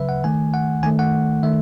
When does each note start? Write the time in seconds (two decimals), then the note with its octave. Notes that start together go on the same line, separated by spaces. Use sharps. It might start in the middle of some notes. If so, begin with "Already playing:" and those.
Already playing: C#3 F#3 B4 E5
0.09 F#5
0.24 D#3 A3 G#5
0.54 F#5
0.83 D#3 A3 G#5
0.99 F#5
1.43 D#3 A3 E5